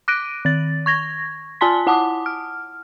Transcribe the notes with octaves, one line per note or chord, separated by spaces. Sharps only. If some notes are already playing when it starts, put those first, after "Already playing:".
D6 F#6 A#6 D7 D#7
D#3 A6
C#6 G#6 A#6
F4 G#5 A5 C6 B6
E4 F#5 A5 D6 D#6
F6